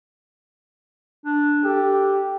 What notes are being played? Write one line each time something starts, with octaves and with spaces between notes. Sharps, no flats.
D4
G4 A4